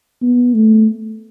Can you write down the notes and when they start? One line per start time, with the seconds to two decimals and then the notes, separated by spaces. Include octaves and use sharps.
0.22 B3
0.54 A3